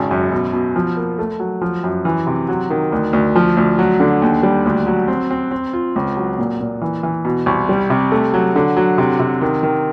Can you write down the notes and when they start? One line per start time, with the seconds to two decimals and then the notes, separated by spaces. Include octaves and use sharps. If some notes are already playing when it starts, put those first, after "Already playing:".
Already playing: G#1 C#3
0.11 F#2
0.32 B2
0.53 B2
0.76 F3
0.97 A#3
1.19 A3
1.40 F#3
1.61 F3
1.84 F#2
2.05 E3
2.27 C3
2.49 F#3
2.70 D#3
2.92 D2
3.13 D2
3.36 F3
3.57 D2
3.79 F#3
4.00 D3
4.22 D#2
4.43 G3
4.66 D2
4.87 F#3
5.08 C4
5.31 C4
5.51 C4
5.73 F4
5.96 C#2
6.17 F#3
6.39 A#2
6.61 A#2
6.82 E3
7.03 E3
7.25 B2
7.46 C2
7.69 G3
7.90 C3
8.12 A3
8.34 F#3
8.56 D3
8.77 F#3
8.98 C3
9.20 C3
9.41 D#3
9.63 D#3